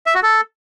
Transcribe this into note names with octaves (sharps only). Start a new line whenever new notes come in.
E5
F#4
A4